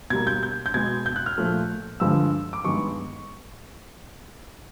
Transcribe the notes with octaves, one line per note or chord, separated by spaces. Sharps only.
B2 G3 A#3 G#6
G6
G6
G6
B2 G#3 B3 G#6
G6
F#6
F6
A#2 F3 A3
G2 D3 F3 G#3 E6
D6
G2 D#3 G#3 B3 C#6